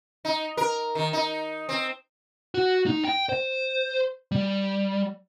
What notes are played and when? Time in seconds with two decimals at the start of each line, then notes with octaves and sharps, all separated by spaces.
0.25 D#4
0.57 A#4
0.95 D#3
1.13 D#4
1.69 C4
2.54 F#4
2.86 D#4
3.04 G5
3.29 C5
4.32 G3